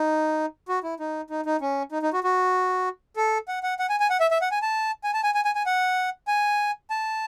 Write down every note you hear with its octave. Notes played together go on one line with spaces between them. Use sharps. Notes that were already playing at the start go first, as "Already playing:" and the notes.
Already playing: D#4
F#4
E4
D#4
D#4
D#4
C#4
D#4
D#4
F#4
F#4
A4
F#5
F#5
F#5
G#5
G#5
F#5
E5
E5
F#5
G#5
A5
G#5
A5
G#5
G#5
G#5
G#5
F#5
G#5
A5